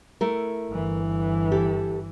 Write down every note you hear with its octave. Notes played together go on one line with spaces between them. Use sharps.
A3 E4 A#4
G1 E3
G4 A4